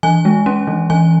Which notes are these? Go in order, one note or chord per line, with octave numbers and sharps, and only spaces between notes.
E3 G#5
G#3
C#4
E3
E3 G#5